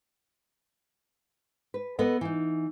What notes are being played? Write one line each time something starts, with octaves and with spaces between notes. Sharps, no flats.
B4
B3 A4 D#5
E3 D#4